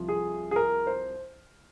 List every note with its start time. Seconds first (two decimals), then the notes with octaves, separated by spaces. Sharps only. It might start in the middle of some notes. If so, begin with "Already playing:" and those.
Already playing: C2 C3 F3
0.09 G#4
0.51 G#4
0.56 A#4
0.87 C5